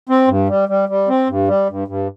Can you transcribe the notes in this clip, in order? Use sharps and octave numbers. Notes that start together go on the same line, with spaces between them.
C4
G2
G3
G3
G3
C4
G2
G3
G2
G2